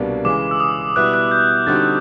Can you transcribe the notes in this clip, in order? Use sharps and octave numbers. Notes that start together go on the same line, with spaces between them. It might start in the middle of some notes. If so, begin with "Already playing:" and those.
Already playing: C2 B2 G3 A#3 D4
C#3 E3 G#3 D6
E6
D#6
B2 G3 B3 E4 F#6
F#6
G6
D3 G3 C4 D#4 F#4 A6